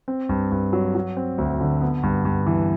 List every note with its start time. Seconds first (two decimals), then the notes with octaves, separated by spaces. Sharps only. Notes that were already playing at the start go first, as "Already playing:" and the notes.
0.08 C4
0.29 G2
0.52 G2
0.73 F#3
0.95 F#3
1.17 C4
1.38 D2
1.60 D3
1.81 B3
2.03 G2
2.25 G2
2.46 E3